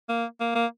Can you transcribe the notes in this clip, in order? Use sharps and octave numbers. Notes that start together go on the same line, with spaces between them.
A#3
A#3
A#3